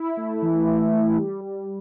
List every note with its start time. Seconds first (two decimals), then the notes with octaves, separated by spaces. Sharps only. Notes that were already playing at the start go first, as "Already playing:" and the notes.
Already playing: E4
0.17 A3
0.42 E3
0.66 E3
0.92 A3
1.16 G3
1.41 G3